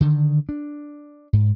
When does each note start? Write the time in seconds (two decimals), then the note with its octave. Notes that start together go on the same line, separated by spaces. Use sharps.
0.01 D3 D#3
0.49 D4
1.33 G#2